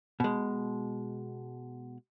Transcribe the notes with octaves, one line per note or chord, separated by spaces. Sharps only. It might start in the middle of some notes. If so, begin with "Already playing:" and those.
B2 G#3